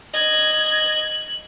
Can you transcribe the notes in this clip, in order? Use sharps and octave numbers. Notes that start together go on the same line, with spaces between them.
D#5 G#6 F#7